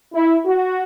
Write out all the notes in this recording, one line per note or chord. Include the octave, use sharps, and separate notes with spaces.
E4
F#4